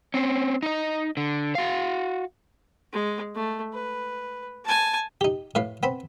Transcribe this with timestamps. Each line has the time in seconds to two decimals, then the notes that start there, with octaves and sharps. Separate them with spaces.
0.14 C4 C#4
0.63 D#4 D#5
1.17 D3
1.55 F#4 F5
2.93 G#3
3.35 A3
3.73 B4
4.65 G#5 A5
5.21 D#4 G4
5.55 A2 B4 F5
5.83 B3 C4 B5